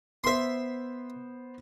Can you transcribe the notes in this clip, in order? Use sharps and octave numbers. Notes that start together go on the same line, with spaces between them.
B3 C5 E5 C6